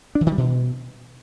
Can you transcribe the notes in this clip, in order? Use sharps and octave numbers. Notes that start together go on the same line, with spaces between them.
D4
E3
D#3
G3
B2